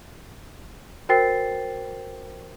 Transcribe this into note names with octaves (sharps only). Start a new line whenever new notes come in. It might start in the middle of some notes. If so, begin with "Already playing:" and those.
F#4 A#4 C5 G5 A6 C7